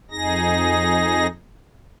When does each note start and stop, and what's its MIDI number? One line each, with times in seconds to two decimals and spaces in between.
0.11 1.27 41
0.11 1.27 63
0.11 1.27 68
0.11 1.27 94